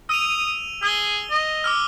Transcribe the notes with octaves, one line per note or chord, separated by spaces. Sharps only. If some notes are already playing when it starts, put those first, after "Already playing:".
D#6 E6 D#7 F7
G#4 E6 G7
D#5
D6 E6 F6